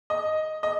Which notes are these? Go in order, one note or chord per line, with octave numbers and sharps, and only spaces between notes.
D#5
D#5